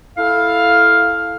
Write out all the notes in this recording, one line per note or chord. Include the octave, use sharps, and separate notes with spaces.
E4 A4 F5